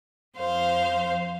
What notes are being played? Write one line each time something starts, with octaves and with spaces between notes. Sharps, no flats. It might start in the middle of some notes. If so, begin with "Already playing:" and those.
F2 F3 C5 F5 C6